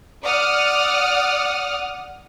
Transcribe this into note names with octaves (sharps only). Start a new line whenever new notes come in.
D5 F#5 D#6 F6